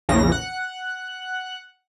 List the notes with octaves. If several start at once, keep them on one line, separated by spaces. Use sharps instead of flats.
A#1 E2 C#3 A#6
F#5 F#6